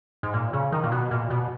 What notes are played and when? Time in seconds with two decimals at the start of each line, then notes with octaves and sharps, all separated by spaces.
0.23 G#2
0.34 A#2
0.53 C#3
0.72 D#3
0.84 A#2
0.92 B2
1.11 A#2
1.30 B2